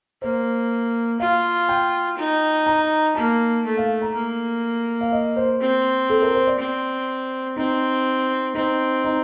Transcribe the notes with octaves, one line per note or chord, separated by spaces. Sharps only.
A#3 C5
F4 F5
G5
D#4
A#5
A#3 A5
A3
F5
A#5
A#3
F5
D#5
C5
C4
A4
A#4
C5
D5
C4
C4 D#4
C4 D#4
D#4